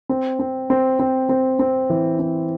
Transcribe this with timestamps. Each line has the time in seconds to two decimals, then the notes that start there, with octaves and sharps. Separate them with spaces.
0.09 C4
0.39 C4
0.70 C4
1.00 C4
1.29 C4
1.59 C4
1.90 E3
2.19 C4